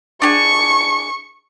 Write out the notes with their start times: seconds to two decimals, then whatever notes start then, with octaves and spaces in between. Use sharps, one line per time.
0.22 D4 G4 G#4 C#6